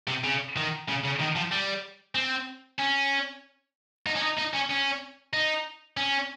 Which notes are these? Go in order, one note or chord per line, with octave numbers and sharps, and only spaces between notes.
C3
C#3
D#3
C#3
C#3
D#3
F3
G3
C4
C#4
D#4
C#4
D#4
D#4
C#4
C#4
D#4
C#4